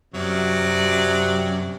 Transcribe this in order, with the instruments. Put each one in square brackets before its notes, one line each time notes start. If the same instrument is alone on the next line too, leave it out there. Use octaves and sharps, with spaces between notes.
[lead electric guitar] F#2 [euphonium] C3 [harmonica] F#3 D5